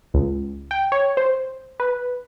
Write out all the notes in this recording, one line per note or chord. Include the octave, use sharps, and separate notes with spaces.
C#2
G5
C#5
C5
B4